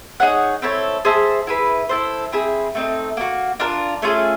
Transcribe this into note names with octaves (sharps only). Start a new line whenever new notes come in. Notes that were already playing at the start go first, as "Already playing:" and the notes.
D#4 G#4 C#5 F#5
C4 E4 A4 C#5
G#4 C5 E5 A5
E4 G#4 B4
E4 A4 C5
C4 E4 G#4
A3 C4 D#4
A#3 D4 F#4
D4 F4 A#4
A3 C#4 F4 G#4